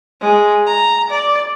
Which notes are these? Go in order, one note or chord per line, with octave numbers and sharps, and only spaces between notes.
G#3
A#5
D5